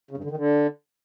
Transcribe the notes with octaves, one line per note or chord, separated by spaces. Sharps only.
C#3
G2
D3
D#3
D3